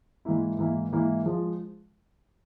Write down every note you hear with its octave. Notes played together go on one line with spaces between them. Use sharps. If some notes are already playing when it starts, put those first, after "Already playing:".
G#2 E3 A#3 E4
G#2 E3 A#3 E4
G#2 E3 A#3 E4
F3 G#3